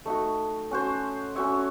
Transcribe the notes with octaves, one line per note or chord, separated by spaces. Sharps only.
A3 D#4 F#4
C#4 F#4 C5
C#4 F#4 C#5 E5